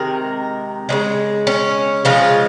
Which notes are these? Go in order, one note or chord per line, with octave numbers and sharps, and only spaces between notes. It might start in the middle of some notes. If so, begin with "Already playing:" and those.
Already playing: C3 D#3 G#3 A#4
C#3 F3 G#3
C#4
C#3 F3 G#3 F4